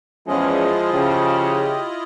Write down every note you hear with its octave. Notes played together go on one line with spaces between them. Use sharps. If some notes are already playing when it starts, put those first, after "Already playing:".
E2 F3 G#3 C#4 E4 F4 D#5
C#3 G4